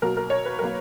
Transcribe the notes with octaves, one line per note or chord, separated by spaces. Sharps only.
B2 F#3 A#3 A#4
A#4
C#5
B4
B2 F#3 A#3 A#4